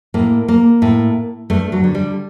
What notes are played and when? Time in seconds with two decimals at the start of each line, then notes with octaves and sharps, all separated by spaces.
0.14 A2 A#3
0.48 A#3
0.82 A2
1.50 G2 A3
1.72 F#3
1.84 D3
1.95 G3